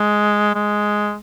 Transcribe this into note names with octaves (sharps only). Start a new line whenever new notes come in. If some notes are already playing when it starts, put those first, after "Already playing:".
Already playing: G#3
G#3